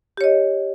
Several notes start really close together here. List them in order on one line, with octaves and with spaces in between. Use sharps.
G4 C#5 D#5